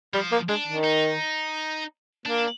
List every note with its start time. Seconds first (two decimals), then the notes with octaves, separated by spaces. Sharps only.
0.14 F3 G3
0.32 A#3
0.49 G#3 D4
0.67 D#3
0.84 D#4
2.26 A#3 D4